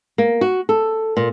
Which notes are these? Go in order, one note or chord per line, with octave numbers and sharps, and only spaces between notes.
A#3
F#4
A4
A#2